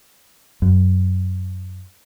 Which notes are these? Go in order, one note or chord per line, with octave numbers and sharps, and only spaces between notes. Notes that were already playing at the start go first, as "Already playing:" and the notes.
F#2